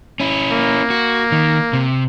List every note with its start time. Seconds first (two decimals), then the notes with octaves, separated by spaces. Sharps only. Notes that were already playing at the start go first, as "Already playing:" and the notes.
0.20 C#4 E4
0.51 A#3
0.90 F#4
1.32 D#3
1.73 C3